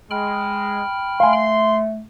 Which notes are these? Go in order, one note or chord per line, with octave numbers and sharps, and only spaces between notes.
G#3 G5 B5 F6
A3 F5 G#5 C6